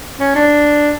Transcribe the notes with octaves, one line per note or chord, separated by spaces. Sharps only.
C#4
D4